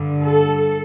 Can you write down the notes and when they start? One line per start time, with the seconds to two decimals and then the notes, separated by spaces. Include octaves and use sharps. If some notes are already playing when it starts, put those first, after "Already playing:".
Already playing: G2 D3
0.23 A4